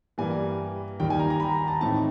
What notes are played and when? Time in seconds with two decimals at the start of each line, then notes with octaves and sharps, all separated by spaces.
0.18 G2 E3 G3 A#3 G#5
1.00 D#2 D#3 G3 G5
1.10 G#5
1.19 A#5
1.30 A#5
1.40 B5
1.55 A#5
1.68 A5
1.81 A2 E3 A3 C4 D#4 A5